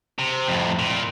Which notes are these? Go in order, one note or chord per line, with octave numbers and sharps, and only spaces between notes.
C3
F2 A2
A#2